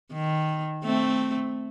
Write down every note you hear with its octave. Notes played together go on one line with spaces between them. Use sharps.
D#3
A3 C4